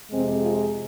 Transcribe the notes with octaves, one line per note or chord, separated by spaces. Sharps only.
F2 C3 G#3 C4
F4